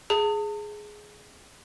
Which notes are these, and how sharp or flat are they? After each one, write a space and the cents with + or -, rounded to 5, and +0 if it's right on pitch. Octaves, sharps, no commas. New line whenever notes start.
G#4 +10 A5 +40